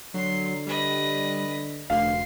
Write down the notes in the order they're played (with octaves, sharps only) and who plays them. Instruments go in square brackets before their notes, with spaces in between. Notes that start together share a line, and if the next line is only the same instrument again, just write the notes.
[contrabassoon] D3 [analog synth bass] F#3 [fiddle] C6
[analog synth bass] G3 [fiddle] B4 D#5
[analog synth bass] F1 [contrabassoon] D2 [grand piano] F5 [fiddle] C6